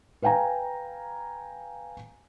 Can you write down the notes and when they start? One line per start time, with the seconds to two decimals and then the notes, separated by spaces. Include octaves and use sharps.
0.22 B4 F5 G5 G#5 A#5